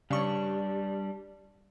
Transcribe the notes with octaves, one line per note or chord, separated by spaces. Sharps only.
C#3 G3 D4 C#6